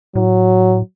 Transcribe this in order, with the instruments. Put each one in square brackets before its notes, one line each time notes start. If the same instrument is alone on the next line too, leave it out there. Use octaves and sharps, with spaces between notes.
[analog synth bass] A2 [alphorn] F#3